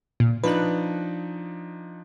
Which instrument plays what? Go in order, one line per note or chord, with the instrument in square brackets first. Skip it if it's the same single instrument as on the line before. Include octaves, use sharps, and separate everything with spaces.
[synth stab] A#2
[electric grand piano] F3 D4 D#4 [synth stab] B4 F#6